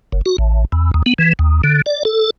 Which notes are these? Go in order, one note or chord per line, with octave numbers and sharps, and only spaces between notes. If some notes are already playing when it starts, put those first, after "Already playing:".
F#1
F#4
A1
E2
D#2
B3
E3
D#2
D3
D5
A4